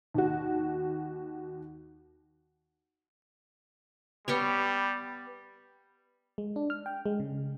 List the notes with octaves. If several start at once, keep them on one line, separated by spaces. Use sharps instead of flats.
D#2 F#4
G3 B3 G4 C#5
G#3
D4
F6
G5
G#3
C#3